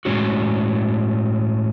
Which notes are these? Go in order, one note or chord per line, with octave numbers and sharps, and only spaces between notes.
A2 G#3 C#4 F#4